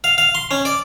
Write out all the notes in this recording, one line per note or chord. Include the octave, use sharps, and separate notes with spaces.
F5
F5
C6
C#4
D5